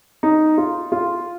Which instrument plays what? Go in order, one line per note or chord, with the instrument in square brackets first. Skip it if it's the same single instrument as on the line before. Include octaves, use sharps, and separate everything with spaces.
[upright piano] D#4
F4
F4